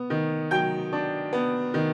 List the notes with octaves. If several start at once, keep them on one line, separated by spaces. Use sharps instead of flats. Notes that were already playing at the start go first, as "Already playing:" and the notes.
Already playing: B3
D#3
F#3 G5 G6
D4
B3
D#3